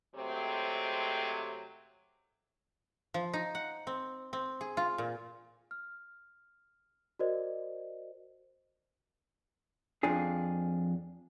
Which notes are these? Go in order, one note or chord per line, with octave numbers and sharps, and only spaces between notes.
C3 F#3 G#3 A3 C4
F3
D#4
F#5
C4
C4
G#4
F4
A#2
F6
F#4 A#4 C5 D5 D#5
F2 F3 D4 G#4